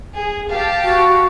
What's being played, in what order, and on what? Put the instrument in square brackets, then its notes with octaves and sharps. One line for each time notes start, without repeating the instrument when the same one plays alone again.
[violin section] G#4 G#5
G4 F5 A5
[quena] F#4